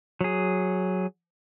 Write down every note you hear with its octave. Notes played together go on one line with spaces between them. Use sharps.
F#3 G#4